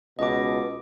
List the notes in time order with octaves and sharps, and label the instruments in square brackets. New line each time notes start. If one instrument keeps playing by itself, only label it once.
[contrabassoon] C#2 [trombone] B2 [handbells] D#5 D6